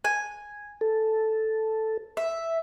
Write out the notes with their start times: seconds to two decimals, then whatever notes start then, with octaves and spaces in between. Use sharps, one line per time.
0.04 G#5
0.81 A4
2.17 E5